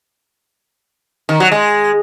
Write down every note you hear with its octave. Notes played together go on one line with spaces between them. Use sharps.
D#3
F#3
G#3